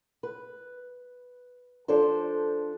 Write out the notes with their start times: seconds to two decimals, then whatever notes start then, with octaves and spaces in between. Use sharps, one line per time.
0.23 B4
1.88 F3 D4 A4 C5